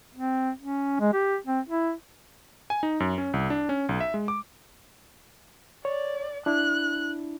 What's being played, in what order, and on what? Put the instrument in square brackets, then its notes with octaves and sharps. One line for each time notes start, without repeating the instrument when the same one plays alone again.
[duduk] C4
C#4
G#3
G4
C4
E4
[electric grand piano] G#5
D#4
F#2
C#4
C2
D4
C#4
B1
E5
G#3
D6
[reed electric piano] C#5 [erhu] D5
[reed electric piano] D4 E4 [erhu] F#6